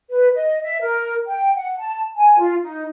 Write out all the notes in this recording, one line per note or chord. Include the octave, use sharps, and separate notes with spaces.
B4
D#5
E5
A#4
G5
F#5
A5
G#5
F4
D#4